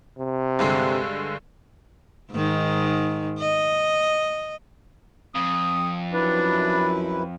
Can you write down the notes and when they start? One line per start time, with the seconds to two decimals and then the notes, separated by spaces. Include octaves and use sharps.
0.18 C3
0.59 G2 D3 G#3
2.32 G#2 D#3
3.39 D#5
5.35 F2 D#6
6.13 F#2 D4 E4 B4